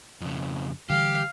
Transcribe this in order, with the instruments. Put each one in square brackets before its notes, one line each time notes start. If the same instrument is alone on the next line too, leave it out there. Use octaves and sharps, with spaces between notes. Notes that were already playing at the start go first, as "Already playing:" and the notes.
[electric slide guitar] F2 C#3
[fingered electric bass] D3 E3 G3 [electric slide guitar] G4 [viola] F5